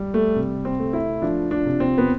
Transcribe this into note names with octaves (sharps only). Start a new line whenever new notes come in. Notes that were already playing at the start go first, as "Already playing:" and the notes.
Already playing: G3
A3
C3
C4
A3
E4
F3 D4
D4
C3
C4
B3